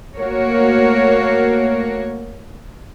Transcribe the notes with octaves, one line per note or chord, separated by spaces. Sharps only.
A3 A#3 F#4 A#4 C#5